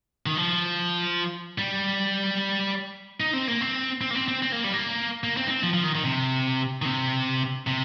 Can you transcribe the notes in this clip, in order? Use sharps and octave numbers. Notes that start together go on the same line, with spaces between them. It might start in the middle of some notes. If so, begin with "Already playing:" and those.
D#3
F3
G3
D#4
C4
A#3
C4
C4
A#3
C4
C4
C4
A#3
G3
A#3
A#3
C4
D#4
C4
F3
F3
D#3
D#3
C3
D#3
C3
C3